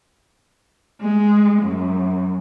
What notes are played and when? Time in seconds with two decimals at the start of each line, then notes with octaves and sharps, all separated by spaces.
1.02 G#3
1.63 F#2